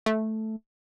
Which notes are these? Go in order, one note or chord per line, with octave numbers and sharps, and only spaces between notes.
A3